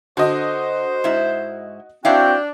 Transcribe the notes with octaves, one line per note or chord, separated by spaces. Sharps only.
D3 F#4 C5 D#5
G#2 E4
C4 D4 E4 F#4 C#5 F5 G5